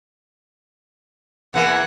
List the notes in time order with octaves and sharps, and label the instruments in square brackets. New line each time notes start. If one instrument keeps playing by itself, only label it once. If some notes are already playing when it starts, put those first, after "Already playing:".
[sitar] E2 E3 A#3 [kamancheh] F#5